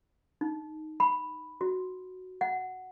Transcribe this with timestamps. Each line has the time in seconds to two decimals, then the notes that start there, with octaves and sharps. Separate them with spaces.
0.41 D#4
1.00 B5
1.61 F#4
2.41 F#5